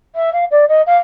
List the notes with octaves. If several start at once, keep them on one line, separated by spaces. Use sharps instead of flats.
E5
F5
D5
D#5
F5